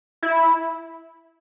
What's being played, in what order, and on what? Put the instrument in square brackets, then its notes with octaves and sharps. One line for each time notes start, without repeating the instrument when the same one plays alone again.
[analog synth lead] E4